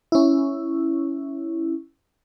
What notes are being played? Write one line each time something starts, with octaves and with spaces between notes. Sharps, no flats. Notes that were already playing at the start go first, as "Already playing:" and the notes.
C#4 E4